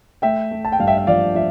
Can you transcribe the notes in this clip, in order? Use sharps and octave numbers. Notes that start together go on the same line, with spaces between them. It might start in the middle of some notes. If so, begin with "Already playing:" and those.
A3 E5 G5
A3
A5
G5
G2 F5
E5 G5
E5
F3 D5 F5
F3 E5